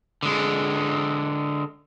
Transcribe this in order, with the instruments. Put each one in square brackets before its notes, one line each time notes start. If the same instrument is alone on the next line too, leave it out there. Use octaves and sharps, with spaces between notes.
[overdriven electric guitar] D3 G#3